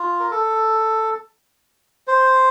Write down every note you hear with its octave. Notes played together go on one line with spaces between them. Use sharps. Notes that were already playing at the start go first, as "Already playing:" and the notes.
Already playing: F4
A#4
A4
C5